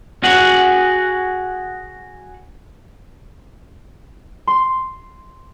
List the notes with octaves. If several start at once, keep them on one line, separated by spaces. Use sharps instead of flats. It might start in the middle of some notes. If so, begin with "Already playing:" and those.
F#4 G#4 F#5
C6